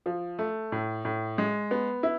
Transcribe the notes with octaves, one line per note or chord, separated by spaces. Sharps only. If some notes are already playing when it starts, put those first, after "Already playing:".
F3
A3
A2
A2
G#3
B3
E4